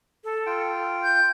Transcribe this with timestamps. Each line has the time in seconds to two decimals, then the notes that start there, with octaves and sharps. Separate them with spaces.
0.24 A4
0.46 F4 G5
1.03 G6